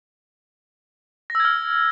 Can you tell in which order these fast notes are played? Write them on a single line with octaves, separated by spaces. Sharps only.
A#6 E6 G#6 F6